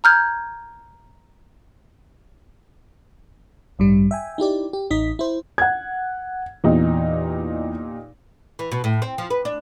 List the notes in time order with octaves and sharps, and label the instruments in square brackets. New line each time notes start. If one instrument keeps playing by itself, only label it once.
[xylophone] A#5 F6 G6 G#6
[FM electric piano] A1 G2 G3
E5 G5 G#5
D#4 E4 G4 D5
G4
A1 D#4 D#5 B6
E4 C5
[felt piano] F#5 G#6
[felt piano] E2 [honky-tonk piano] A#2 D#4 G4
[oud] E3
B2
A2
C4
F3
B4
D4